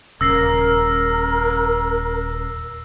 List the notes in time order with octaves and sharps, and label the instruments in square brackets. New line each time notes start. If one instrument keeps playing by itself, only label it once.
[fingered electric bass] D#1 C#3 [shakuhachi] A#4 [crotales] E6 A#6 C7